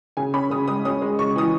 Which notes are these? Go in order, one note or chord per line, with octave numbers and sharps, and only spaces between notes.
C#3 G#5
C#4 B5
C#3 D#6
G#3 D#6
C#4 D#6
G#3
C#3 C#6
E3 D#6